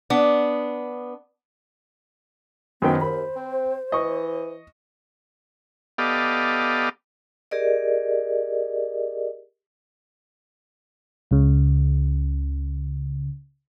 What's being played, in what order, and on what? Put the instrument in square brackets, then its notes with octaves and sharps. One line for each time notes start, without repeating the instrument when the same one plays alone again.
[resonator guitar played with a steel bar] B3 D4
[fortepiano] F#2 D#3 G5 [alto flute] B3 [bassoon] C4
[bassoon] D#2 [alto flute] C5 [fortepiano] B5
[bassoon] C4
[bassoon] E3 [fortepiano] D#5 C#6
[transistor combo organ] B3 G4 A4 D5 D#5 F5
[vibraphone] G4 G#4 A#4 D5 D#5
[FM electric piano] C#2 C#3